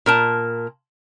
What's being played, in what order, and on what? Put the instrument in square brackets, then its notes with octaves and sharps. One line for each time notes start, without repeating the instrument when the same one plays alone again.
[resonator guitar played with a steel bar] A#2 A#4 A5